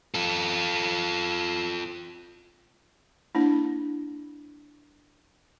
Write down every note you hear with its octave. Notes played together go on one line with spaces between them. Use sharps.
F4 A4
A#3 D4 E4